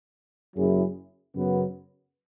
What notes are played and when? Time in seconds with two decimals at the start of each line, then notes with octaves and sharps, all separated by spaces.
0.56 F#1 F#2 F#3 E4 G#4
1.35 F#2 C#3 F#3 B3